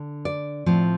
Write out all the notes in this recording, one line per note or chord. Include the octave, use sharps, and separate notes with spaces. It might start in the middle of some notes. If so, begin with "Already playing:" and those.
Already playing: D3 D4
D5
A2 F3 C4